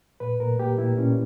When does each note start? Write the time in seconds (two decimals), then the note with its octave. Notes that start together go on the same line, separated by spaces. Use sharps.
0.20 A#2 B4
0.40 A#2 A#4
0.59 A#3 G4
0.78 A#2 E4
0.97 A#2 C#4